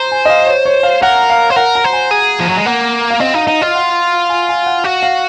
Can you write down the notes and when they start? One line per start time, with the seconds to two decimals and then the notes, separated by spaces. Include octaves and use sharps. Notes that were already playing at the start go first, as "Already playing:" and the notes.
Already playing: C5 A#5
0.12 G#5
0.25 D#5
0.30 F5
0.47 C#5
0.65 C#5
0.83 F5
1.02 A#4 F#5
1.30 F5
1.50 C5
1.56 A#4 F#5
1.75 A#5
1.84 C5
1.93 G#5
2.11 G#4
2.40 F3
2.49 F#3
2.57 G#3
2.66 A#3 F#5
3.11 F5
3.20 C4 D#5
3.34 D#4 F5
3.47 D#4 D#5
3.62 F4 D#5
3.75 F#5
4.30 G#5
4.49 G#5
4.66 F#5
4.84 F#4 F5
5.03 F5